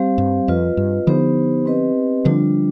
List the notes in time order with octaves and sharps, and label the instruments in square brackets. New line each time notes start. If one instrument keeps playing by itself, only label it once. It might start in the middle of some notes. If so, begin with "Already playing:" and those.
Already playing: [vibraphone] G3 C4 G4 C5 F5
[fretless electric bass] G2
[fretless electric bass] F2 [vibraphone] F4 B4 D#5
[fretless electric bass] G2
[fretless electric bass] D3 F3 [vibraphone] B3 D#4 G4 C5
[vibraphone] C4 G4 B4 D#5
[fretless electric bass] D3 F3 [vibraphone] G3 D4 F4